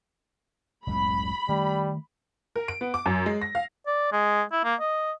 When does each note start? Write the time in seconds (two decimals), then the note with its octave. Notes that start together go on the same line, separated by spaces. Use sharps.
0.87 F#1 C#2 A2 B5
1.49 D#3 G3 A3
2.56 A#4
2.68 D7
2.81 B3
2.94 D6
3.06 F#2
3.26 G#3
3.41 A#6
3.55 F5
3.87 D5
4.12 G#3
4.52 E4
4.64 A#3
4.80 D#5